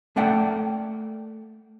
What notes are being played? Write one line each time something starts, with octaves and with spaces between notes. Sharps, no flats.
A3 A#3 D5 F#5 G5